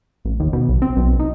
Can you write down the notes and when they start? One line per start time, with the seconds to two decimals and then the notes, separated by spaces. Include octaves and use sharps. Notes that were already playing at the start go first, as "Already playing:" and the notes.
0.25 A1
0.40 D#2
0.53 B2
0.69 B1
0.82 C4
0.97 B1
1.19 D#4